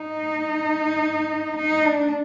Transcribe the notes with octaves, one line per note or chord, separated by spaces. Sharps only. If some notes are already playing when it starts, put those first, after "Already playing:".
Already playing: D#4
D#4
D4